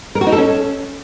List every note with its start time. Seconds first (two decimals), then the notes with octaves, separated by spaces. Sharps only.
0.15 A#4
0.21 F#4
0.27 D#4
0.32 A4
0.38 C#4